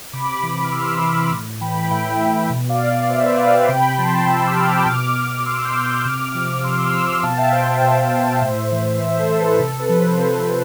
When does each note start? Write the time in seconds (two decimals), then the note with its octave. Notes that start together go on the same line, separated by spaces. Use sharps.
0.13 C3 B5 D6
0.43 E3
0.64 F6
0.72 C3 C6 E6
1.01 E3 B5 D6
1.32 A2
1.61 E3 G5 B5
1.91 A2 E5 G5
2.20 E3
2.50 B2
2.69 D5 F5
2.90 D5 F5
3.08 B2 C5 E5
3.24 B4 D5
3.38 D5 F5
3.54 E5 G5
3.68 C3 G5 B5
3.98 F3 A5 C6
4.27 C3 C6 E6
4.47 D6 F6
4.57 F3
4.66 E6 G6
4.86 B2 D6 F6
5.45 B2 C6 E6
5.65 E6 G6
5.85 E6 G6
6.05 C3 D6 F6
6.35 F3
6.64 C3 C6 E6
6.86 F6
6.93 F3 C6 E6
7.23 B2 F5 A5
7.37 E5 G5
7.52 C5 E5
7.67 C5 E5
7.82 B2
8.41 A2
8.72 E3
9.00 A2 C5 E5
9.20 A4 C5
9.30 E3
9.41 B4
9.59 C3 A4
9.80 B4
9.89 F3
9.99 A4 C5
10.19 C3
10.48 F3